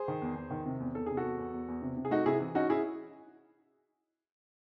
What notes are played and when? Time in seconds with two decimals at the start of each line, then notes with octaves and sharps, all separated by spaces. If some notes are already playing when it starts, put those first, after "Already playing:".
Already playing: G#4 C5
0.08 D#3
0.22 E2
0.36 E2
0.51 D#3
0.66 C3
0.80 E2
0.95 E2 A4
1.06 C3 G#4
1.17 F#4 A4
1.24 E2
1.38 E2
1.54 E2
1.68 E2
1.82 C3
1.97 C3
2.05 G#4
2.11 A3 D#4 F#4
2.26 C3 E4 G#4
2.40 E3
2.55 C#4 D#4 F#4
2.69 C#4 E4 G#4